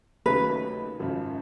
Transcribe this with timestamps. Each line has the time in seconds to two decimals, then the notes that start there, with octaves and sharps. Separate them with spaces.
0.26 D#2 C#3 F#3 A3 C#4 B4
0.99 G#1 F#2 C#3 F3